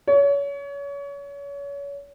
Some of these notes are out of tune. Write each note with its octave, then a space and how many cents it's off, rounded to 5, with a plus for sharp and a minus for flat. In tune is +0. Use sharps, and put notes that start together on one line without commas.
C#5 +30